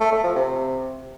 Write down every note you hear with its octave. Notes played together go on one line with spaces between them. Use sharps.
A3
A3
F3
C3